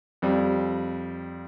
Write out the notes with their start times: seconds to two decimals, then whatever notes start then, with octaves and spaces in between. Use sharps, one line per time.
0.22 F2 G3